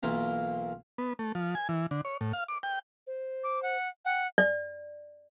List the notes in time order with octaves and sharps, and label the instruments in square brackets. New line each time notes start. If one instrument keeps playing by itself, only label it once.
[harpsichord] B1 E3 A#3 F4
[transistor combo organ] B3
A3
F3
G#5
E3
D3
C#5
A2
F5
D6
G5
[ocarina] C5
[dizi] D6
F#5
[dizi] F#5 [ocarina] G5
[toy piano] D5